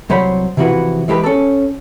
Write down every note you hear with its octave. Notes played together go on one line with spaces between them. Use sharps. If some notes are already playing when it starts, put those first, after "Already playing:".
C2 F#3 C5 C#5 B5
C3 E3 F3 E4 F#4 B4
E3 G#3 G4 A#4 B4
C#4 A4